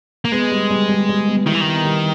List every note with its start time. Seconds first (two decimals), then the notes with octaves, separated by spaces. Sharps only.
0.25 A#3
0.32 G#3 B3
0.52 G3
0.71 G3
0.89 G3
1.09 G3
1.28 B3
1.46 D#3 E4
1.54 E3
1.61 D#3 B3
1.85 G3